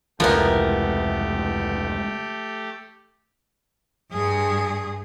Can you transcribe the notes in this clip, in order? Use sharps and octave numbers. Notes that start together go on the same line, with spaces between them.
F1 C#2 E3 F3 A3 B3 G4 A#4
G2 G#4